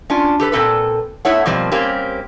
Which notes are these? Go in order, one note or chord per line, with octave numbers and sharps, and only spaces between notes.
C#4 D4 F4
G4 A4 B4
A#2 C4 A4 B4
A3 B3 E4 C#5 F#5
B2 F3 G3 A#3 C4
G3 A#3 C4 C#4 G4